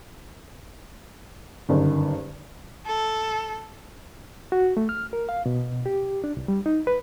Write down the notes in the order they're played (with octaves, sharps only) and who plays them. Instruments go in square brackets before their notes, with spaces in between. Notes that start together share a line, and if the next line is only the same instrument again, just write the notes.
[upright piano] F#1 G2 D#3 [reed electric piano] D3
[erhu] A4
[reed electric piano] F#4
A3
F6
A#4
F5
B2
G4
D4
C2
G3
D#4
B4